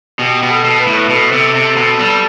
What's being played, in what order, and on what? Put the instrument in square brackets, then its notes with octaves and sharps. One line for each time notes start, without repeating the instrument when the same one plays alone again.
[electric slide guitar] B2 [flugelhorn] G4
[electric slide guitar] B2
[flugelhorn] A4
[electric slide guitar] B2
[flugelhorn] B4
[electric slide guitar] A2
[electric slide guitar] B2 [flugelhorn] A4
[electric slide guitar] C3
C3
B2
G3